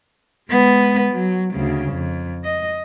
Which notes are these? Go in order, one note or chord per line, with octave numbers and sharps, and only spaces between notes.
G#3 B3
F#3
D2 C#3
F2
D#5